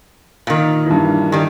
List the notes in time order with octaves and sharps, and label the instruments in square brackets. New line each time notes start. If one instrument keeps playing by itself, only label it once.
[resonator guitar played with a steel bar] A#2 D#3
[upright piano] G2 E3
[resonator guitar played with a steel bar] D#3 G3